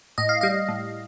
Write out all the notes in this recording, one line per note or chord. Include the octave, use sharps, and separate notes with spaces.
A2 D#5
F5
G3 D#5
A2